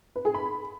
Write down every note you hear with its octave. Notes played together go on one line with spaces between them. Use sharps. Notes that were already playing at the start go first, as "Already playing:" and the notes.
B4
G#4
B5